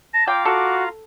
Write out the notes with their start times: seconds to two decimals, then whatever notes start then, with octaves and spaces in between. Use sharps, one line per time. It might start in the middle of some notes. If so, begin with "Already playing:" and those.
0.14 A5 A#6
0.27 F4 F5 G5 A#5 D6
0.45 F#4 A4